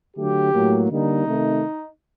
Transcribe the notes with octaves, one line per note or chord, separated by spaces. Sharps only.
D3 F#3 A3 G4
A2 F#3 A#3
D3 G3 A#3 D#4
C3 D#3 A3